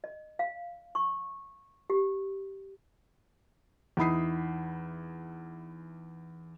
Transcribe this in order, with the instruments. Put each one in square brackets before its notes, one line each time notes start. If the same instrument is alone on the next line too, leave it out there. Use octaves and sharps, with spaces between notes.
[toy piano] D#5
F5
C#6
G4
[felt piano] E2 D#4 E4 B5 D#6 C7